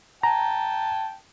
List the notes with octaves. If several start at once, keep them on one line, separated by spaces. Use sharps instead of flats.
G5 A5 A#5